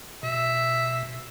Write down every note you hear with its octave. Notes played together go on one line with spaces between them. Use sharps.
B2 E5